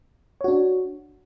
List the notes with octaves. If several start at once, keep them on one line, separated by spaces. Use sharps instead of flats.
D4 F#4 C#5